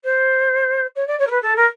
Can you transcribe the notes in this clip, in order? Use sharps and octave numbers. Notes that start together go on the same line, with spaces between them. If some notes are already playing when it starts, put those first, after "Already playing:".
C5
C#5
D5
C#5
A#4
B4
A4
A#4